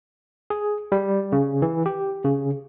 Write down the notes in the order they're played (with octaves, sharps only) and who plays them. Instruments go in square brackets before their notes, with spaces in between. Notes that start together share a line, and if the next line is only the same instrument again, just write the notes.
[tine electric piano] G#4
G3
C#3
E3
G4
C#3